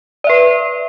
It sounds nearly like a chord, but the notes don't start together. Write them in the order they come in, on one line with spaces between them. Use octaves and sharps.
D5 E5 B4